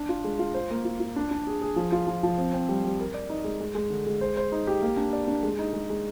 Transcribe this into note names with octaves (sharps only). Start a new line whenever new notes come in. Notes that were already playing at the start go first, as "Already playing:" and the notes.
Already playing: D4
F4
G#3
F4
C5
A#3
F4
F4
D4
D4
G#4
G#4
F3
F4
F3
F3
C4
C4
G3
G3
A#4
D5
D#4
G#3
G#3
G#3
D3
G#3
C5
C5
D#4
G4
A#3
D4
D5
D4
G#3
D#4
G#3
G#3